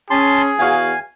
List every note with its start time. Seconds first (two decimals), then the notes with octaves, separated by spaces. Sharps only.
0.10 C#4 G#4 A5 C6
0.59 E2 F#4 F5 G#5